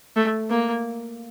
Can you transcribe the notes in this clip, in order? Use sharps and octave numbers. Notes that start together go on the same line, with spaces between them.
A3
A#3